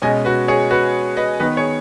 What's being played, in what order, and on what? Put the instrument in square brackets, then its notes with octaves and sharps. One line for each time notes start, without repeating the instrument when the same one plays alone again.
[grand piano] B2 G#3 C#4 D#5 G#5
F#4 B4
G#4 C#5
F#4 B4
B4 D#5
D#3 B3 B4 D#5
G#4 C#5